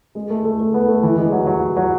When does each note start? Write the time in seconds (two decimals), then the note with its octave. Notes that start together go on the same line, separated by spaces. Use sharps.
0.15 G#3
0.30 A3
0.45 A3
0.60 A3
0.74 B3
0.88 A3
1.03 E3
1.18 G#3
1.32 F#3
1.47 F#3
1.76 F#3